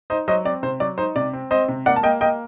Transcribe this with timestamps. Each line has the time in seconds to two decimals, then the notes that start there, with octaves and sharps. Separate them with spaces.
0.10 D#4 C5 D#5
0.28 F#3 C5 D#5
0.45 C4 D5
0.63 C3 C5
0.80 F#3 D5
0.98 D#4 C5
1.16 C3 D5
1.33 C4
1.51 C4 C5 D#5
1.68 C3
1.86 A#3 D5 F#5
1.96 A5
2.03 A#3 D#5 G5
2.21 A#3 D#5 G5